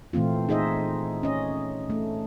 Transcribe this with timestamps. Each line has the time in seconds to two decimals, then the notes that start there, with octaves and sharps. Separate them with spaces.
0.13 A#2 E3 A3 C4 F4
0.49 D#4 G#4 C5 D#5 E5
1.23 C#4 D#5
1.90 A3